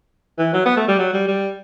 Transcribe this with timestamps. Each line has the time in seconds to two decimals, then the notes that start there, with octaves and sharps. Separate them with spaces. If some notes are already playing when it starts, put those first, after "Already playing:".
0.38 E3
0.53 F#3
0.66 B3
0.77 A3
0.88 G3
0.98 F#3
1.13 G3
1.27 G3